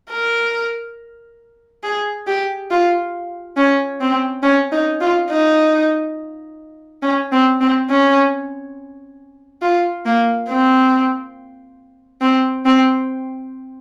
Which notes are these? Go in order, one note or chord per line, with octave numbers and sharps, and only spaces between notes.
A#4
G#4
G4
F4
C#4
C4
C#4
D#4
F4
D#4
C#4
C4
C4
C#4
F4
A#3
C4
C4
C4